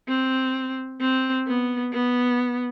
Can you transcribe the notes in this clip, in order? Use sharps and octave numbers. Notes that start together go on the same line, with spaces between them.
C4
C4
B3
B3